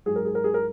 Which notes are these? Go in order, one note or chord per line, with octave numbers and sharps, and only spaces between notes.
G#2 F#3 G#4
A#4
G#4
A#4
G#4
A#4